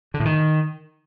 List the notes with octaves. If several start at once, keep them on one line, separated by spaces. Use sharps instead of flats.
D3
A2
D#3